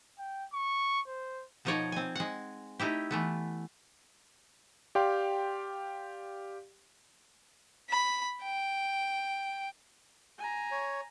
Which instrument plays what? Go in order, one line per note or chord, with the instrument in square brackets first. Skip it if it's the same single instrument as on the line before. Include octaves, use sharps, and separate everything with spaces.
[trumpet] G5
C#6
C5
[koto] B2 F3 D#4 A#4 C#5 D5
C4 G#5
G#3 F#5
A3 D#4 E4 G4
E3 A3 B3
[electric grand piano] G4 D5 F5 G5 C6
[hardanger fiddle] B5
G5
[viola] G#5 A#5
[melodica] C#5